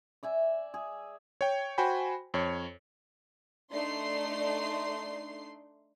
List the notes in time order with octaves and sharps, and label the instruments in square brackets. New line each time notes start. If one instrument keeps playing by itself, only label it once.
[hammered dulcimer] D5 E5 G#5
G#4
[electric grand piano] C#5 G5
F#4 C5 G5 G#5 B5
F2 C#5
[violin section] A3 D4 D#4 D5 C6 C7